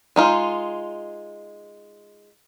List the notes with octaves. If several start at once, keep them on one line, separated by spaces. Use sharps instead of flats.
G#3 D#4 F4